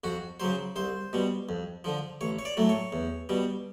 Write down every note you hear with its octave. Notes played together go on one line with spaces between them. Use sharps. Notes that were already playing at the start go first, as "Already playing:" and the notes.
F2 F#4
C#3 F#3 C5
C2 C5
B2 G3
F2
D3 F3
A1 C#5
C#5
D5
A2 F#3 A3
C#5
E2
B2 G3